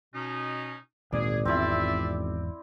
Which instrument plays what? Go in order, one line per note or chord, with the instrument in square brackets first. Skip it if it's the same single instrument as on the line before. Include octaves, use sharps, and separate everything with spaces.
[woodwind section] B2 C#4 D#4
[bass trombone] G#1 [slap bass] D2 A#2 [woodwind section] G#4 [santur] D5
[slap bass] E2 G#2 B3 [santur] C4 E4 [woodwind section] F4 D5 E5